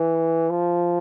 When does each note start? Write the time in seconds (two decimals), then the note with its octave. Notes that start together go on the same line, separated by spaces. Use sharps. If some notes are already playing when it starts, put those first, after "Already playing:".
Already playing: E3
0.50 F3